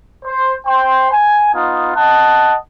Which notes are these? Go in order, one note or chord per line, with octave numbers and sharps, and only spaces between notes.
C5
C5 G5 C6
G#5
B3 D#4 F4
D#5 F#5 A5